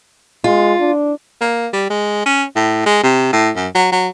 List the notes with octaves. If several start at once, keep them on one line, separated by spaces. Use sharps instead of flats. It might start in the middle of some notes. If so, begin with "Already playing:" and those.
G#3 F4
D4
A#3
G3
G#3
C#4
A2
G#3
C3
A2
F#2
F#3
F#3